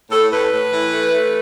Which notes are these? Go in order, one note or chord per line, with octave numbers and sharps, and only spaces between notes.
A2 A4
A2 B4
A2
E3
A3
A3